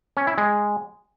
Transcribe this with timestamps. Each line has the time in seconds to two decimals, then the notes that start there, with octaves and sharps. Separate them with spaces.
0.17 C#4
0.27 E4
0.38 G#3